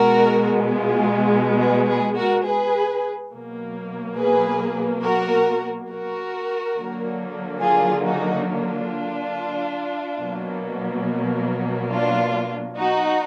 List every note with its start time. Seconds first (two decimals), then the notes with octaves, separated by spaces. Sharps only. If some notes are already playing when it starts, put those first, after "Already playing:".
Already playing: B2 G#3 F#4 A#4
0.73 F4 G#4
1.59 G#4 B4
1.88 G#4 B4
2.16 F#4 A#4
2.45 G#4 B4
3.31 B2 F#3 A#3
4.17 G#4 B4
5.03 F#4 A#4
5.89 F#4 A#4
6.75 D3 F#3 A#3
7.61 F4 G#4
8.04 D#4 F#4
8.47 D4 F4
10.19 B2 F#3 A#3
11.91 D4 F4
12.77 D#4 F#4